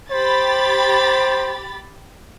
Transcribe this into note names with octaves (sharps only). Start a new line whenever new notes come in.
G4 C5 B5 A6